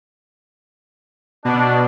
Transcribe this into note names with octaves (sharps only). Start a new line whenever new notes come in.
B2 D4